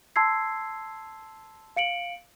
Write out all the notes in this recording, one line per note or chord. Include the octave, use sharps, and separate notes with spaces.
A5 C6 E6 G#6 C7
F5 C#7 D7 F#7